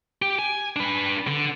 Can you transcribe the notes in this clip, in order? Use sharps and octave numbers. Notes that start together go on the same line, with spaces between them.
G4
G#5
D4 B4
D3